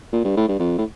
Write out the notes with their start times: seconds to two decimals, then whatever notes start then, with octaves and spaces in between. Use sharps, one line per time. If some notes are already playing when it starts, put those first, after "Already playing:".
0.13 A#2
0.25 G2
0.37 A2
0.48 G2
0.59 F2
0.78 A2